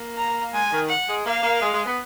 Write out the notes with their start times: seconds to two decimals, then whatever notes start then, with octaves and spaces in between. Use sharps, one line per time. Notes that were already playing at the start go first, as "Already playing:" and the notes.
Already playing: A#3
0.17 A#5
0.54 G#3 G#5
0.72 D#3
0.89 F#5
1.08 G#3
1.26 A#3 F5
1.43 A#3
1.62 G#3
1.74 G#3
1.86 B3